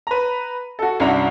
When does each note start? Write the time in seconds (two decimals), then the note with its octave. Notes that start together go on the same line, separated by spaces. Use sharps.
0.07 B4 A#5
0.79 F#4 A4
1.00 C2 G2 C#4 D4 F#4 A#5